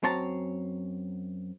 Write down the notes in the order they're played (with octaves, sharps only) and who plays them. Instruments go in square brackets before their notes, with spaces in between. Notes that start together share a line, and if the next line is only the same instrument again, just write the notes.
[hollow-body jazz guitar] F#2 C4 C#5 A5 A#5